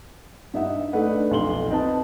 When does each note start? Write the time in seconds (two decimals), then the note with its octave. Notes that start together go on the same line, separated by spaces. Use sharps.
0.54 G2 D#4 E5 F#5
0.93 A3 D4 D#4 B4 F#5
1.31 B1 F2 C6 F#7 G7
1.70 C4 D#4 B4 A5